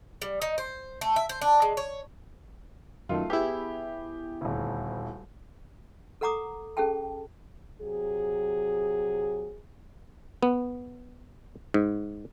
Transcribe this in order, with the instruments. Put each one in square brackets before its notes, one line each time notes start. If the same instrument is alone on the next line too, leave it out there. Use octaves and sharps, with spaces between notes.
[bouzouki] G3
D#4
C5
A3
E5
C5
D4
G#3
C#5
[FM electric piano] F#2 D#3 [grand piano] A3 F4
[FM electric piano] B3 E4 [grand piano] G4 G#4
[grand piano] D#1 D2
[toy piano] A4 A#4 F#5 A#5 D6 D#6
C#4 G#4 A4 G5 A5
[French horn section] C3 F#3 G#4
[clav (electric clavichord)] B3
G#2